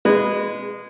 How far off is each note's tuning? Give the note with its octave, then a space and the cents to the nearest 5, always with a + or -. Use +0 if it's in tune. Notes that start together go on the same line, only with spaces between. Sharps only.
G#3 -20 B4 +0